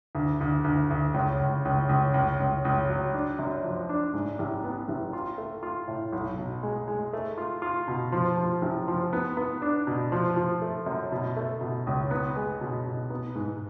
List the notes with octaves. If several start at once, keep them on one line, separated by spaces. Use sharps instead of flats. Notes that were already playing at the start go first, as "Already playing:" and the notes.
D2
D2
D2
D2
C#2
C#2
C#2
C#2
C#2
C#2
C#2
F#3
D4
F#2
F3
D4
G#2
A1
B3
A1
F4
A3
F4
A2
B1
B2
G#3
G#3
A3
F4
F4
B2
F3
F3
A1
F3
B3
B3
D4
B2
F3
F3
A3
F#2
B2
A3
B2
C#2
B3
G#3
B2
B2
B3
G#2